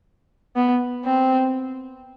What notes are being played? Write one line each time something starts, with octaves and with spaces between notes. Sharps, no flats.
B3
C4